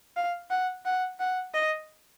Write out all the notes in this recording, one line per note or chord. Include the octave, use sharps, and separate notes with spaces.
F5
F#5
F#5
F#5
D#5